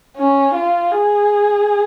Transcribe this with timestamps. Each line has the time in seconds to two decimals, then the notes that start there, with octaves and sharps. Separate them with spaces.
0.16 C#4
0.54 F4
0.92 G#4